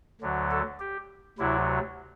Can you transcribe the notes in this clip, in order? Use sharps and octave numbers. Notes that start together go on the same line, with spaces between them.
D2 D3 F#3
A4
G4
D2 C3 F#3 E4